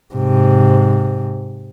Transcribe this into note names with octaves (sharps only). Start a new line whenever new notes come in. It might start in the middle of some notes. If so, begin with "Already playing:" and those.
G#2 C3